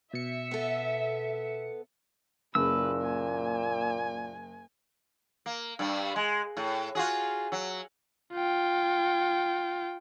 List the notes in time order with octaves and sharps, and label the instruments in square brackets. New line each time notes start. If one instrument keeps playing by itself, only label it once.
[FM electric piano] B2 C#7 [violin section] E5
[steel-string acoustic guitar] B3 A4
[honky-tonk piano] F#1 [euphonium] A#2 [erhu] B4 [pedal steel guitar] E6
[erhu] G#5
[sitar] A#3
G2 G3
G#3
A2
F4 F#4 G#4
F#3
[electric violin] F4 G5